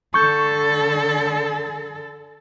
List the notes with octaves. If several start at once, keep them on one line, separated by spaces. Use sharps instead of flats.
D3 A4 C#6 G6